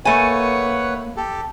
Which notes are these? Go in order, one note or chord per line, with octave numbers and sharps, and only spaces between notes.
A3 A#3 B4 C#5 F#5 G#5
G4 A4